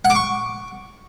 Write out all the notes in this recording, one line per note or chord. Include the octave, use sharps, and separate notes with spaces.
F#5
D6
C#6